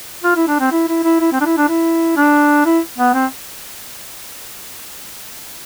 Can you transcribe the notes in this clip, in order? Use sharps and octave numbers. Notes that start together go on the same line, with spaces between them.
F4
E4
D4
C4
E4
E4
E4
E4
C4
D4
E4
D4
E4
D4
E4
B3
C4